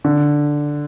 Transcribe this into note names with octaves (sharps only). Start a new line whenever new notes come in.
D3